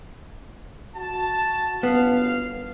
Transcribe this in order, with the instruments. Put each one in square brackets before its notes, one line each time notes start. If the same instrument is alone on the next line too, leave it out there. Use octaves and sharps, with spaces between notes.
[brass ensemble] F#4 A5
[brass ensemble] G1 F#2 F5 [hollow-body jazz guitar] B3